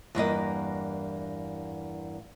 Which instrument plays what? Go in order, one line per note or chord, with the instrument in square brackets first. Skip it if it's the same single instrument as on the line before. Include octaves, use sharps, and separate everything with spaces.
[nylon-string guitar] E2 G2 A#3 D#5